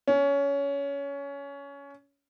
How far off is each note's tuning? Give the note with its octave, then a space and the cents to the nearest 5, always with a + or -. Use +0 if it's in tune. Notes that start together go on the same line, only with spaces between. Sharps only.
C#4 +20